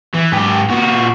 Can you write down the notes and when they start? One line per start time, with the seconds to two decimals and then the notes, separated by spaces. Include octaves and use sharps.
0.14 E3
0.32 G#2 G4
0.70 A#2 F#4